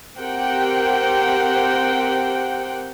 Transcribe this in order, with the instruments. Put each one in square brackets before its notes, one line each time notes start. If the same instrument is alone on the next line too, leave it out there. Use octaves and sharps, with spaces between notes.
[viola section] C4 G4 A#4 C5 F#5 G5